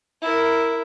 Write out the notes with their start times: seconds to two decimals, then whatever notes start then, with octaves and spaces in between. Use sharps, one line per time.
0.22 E4 A#4